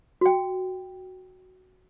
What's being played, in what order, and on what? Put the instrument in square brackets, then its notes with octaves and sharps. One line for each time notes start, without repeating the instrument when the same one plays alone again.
[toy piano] F#4 G5